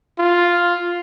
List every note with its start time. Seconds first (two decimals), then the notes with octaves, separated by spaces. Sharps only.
0.19 F4